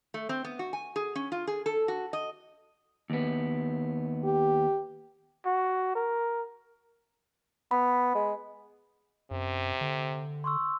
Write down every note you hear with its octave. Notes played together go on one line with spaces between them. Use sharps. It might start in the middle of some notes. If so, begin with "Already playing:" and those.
A3
C4
B3
F#4
G#5
G#4
C#4
F4
G#4
A4
F#4
D#5
D#2 B3
G4
F#4
A#4
B3 B5
G#3
F#2 C3
D3
C6 C#6 E6